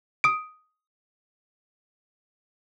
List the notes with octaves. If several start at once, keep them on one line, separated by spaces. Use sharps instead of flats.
D#6 D7